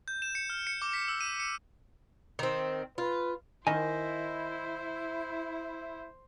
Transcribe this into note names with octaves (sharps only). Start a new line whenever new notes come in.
G6
E7
C#7
F6
C#7
D6
B6
E6
D#7
C#7
D#3 C4
F4 B4
D#3 E4 C5 D#5 G#5